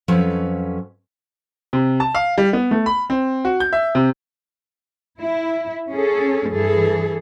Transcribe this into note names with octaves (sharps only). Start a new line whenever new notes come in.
F2 F3 F#3 C#4 A4 B4
C3
A5
F5
G3
B3
A3
B5
C4
F#4
G6
E5
C3
E4
C#4 G#4 A4
G2 E3 G#4 A4